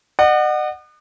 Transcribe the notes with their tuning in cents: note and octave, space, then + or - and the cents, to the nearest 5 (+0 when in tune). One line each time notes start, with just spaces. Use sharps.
D#5 -45 F#5 +0